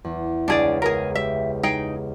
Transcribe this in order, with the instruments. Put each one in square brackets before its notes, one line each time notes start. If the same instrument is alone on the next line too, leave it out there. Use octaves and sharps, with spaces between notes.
[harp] E2
[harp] C#2 [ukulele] D4 G#4 D5
[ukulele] G#4 A#4
[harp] G4 [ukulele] E5
[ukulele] D#4 G#4 G5